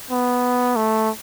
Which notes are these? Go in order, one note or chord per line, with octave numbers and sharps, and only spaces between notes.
B3
A3